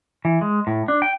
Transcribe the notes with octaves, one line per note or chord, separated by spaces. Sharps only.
E3
G#3
A2
D4
G5